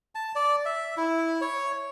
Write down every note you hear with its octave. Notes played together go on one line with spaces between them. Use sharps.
A5
D5
E5
E4
C#5